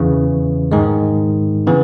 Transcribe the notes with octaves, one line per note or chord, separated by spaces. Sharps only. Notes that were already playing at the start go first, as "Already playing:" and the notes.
Already playing: E2 C#3 E3
G#2 D#3 G#3
C#3 E3 B3